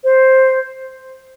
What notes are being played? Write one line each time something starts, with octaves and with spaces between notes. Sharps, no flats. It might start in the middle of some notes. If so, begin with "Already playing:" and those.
C5